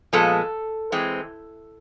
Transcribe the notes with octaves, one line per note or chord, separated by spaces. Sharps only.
A#2 F3 G#3 B3 A4
E3 G#3 C4